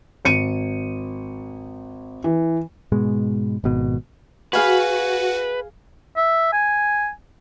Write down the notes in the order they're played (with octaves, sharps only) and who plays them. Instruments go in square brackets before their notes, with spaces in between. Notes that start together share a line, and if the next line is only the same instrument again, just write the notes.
[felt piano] G#1 C#7 D#7
E3
[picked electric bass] G#2 B2 G#3
G#1 B2
[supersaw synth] F#4 [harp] G#4 F5 G#5 [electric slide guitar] B4
[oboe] E5
G#5